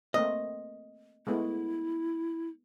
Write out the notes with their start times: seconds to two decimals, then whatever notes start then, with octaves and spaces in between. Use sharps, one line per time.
0.14 A3 A#3 C4 D#5
1.27 G#3 A3 B3 E4